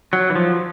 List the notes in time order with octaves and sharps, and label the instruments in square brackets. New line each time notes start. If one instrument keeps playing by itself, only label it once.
[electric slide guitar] F#3
E3
F3